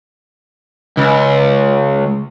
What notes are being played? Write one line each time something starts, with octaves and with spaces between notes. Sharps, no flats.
C#2